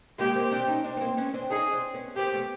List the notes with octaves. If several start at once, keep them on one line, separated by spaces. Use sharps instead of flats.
G#3 A#3 G4
A#3 C4
C4 D4
C#4 D#4
C4 D4
B3
A#3 C4
B3 C#4
C4 D4
C#4 D#4 G#4
C4 D4
B3 C#4
A#3 C4 G4
A3 B3